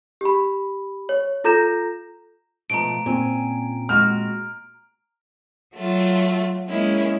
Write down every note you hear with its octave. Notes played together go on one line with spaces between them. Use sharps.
G4 B5
C#5
F4 A4 A#5 G6 A#6 E7
B2 F3 A3 A#5 D7
A#2 C4 C#4 G#5
G#3 F#4 F6
F#3 A3 F4
G#3 A#3 C#4 E4